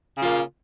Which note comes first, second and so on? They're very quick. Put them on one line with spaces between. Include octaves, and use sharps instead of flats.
C#3 F4 A#3